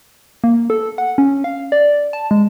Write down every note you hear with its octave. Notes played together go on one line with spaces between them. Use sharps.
A#3
A4
F#5
C#4
F5
D5
A5
G#3